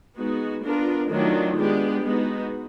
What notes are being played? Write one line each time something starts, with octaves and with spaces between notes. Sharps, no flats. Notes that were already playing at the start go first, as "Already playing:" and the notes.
G#3 B3 D#4 F#4
B3 D4 F4 A#4
D#3 F#3 A3 D4 F4
G#3 B3 D4 G4
G#3 B3 D#4 F#4